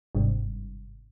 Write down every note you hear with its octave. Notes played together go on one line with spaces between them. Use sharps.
G1 G#2 C3